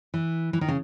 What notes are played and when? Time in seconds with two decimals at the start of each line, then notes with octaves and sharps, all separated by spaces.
0.14 E3
0.53 E3
0.61 D#3
0.68 C#3